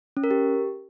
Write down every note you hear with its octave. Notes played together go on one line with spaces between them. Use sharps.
C#4
A#4
G4